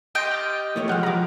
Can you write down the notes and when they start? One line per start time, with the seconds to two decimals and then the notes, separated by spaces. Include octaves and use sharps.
0.15 G4 D#5 G5 C6 G6 A#6
0.31 F6 A6
0.76 A2 A3 C#5
0.89 F3 G#3 F#5 F6 F#6
1.03 F3 F#3 A#5 D6